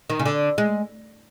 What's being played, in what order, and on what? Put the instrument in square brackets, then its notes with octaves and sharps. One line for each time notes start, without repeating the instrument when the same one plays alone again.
[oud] D#3
C#3
D3
G#3